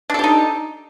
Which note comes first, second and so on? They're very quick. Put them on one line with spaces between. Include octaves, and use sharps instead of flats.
D4 A4 G4 D#4